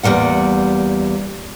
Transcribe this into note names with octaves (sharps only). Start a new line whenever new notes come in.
E2 F3 G3 A#3 F#5